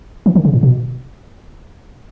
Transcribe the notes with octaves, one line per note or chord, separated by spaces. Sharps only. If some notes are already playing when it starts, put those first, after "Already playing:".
E3
D#3
C#3
A2
B2